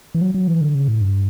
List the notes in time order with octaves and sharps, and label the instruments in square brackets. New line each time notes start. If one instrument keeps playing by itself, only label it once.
[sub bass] E3
F#3
F#3
E3
D3
C#3
A2
G2